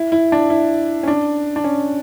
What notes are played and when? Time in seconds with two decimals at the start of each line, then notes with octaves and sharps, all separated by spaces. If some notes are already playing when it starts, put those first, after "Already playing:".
Already playing: E4
0.12 E4
0.32 D4
0.50 E4
1.03 C#4
1.08 D4
1.56 D4
1.64 C#4